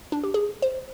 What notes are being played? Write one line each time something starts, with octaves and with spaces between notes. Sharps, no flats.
D4
G4
G#4
C5